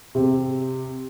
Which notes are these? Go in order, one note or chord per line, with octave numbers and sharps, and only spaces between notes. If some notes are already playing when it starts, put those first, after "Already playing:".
C3